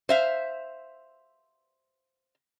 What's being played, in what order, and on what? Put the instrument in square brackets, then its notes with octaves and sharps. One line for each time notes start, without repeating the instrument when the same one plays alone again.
[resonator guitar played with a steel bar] C5 E5 F5